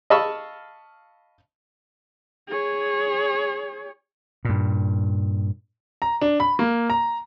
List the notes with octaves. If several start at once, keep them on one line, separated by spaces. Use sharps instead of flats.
D#5 F5 A5 B5 C#6 E6
G#4 C#5
G2 A#2
A#5
D4
B5
A#3
A#5